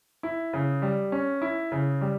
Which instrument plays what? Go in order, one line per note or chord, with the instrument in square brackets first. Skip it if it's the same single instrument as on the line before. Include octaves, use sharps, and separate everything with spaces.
[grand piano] E4
C#3
G3
C#4
E4
C#3
G3